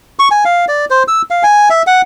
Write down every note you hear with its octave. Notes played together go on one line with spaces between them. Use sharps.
C#6
G#5
F5
D5
C5
E6
F5
G#5
E5
F#5